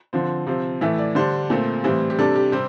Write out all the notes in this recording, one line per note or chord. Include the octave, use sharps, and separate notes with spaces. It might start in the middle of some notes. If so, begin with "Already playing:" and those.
D3 F3 C4
C3 F3 C4
A2 E3 A3 E5
D5
D3 G3 D4 C5
A#2 A3 C4
A2 E3 G3 C4
G4
C3 G3 D4 A4
G4
C3 G3 C4 G4